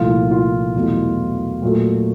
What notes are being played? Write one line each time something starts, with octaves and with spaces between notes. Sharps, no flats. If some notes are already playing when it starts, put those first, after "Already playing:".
Already playing: C2 A#2 F3 A3 F4
F4
E2 B2 F#3 A3
A#2 F#3 A3